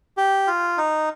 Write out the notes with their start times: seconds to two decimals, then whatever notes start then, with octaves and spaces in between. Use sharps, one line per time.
0.17 G4
0.47 F4
0.78 D#4